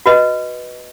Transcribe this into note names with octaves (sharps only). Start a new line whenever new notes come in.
F#4 B4 D#5